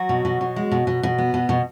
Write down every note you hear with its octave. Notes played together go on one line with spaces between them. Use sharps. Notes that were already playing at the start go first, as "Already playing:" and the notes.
Already playing: F#3 F#4
B2
B2
B2
G#3
B2
B2
B2
B3
B2
B2